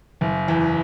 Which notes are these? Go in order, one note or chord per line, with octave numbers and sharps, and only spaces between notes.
F#1
E2